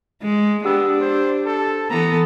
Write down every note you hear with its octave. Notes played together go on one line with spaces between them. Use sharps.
G#3
B3 D4 G4 E6
C5
A4
E3 B3 A4 A#5